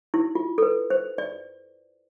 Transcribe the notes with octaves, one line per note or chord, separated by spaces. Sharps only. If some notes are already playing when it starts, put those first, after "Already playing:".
E4
F4
A4
B4
C5
D5